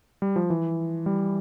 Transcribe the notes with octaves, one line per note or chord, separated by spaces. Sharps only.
G3
F3
E3
G3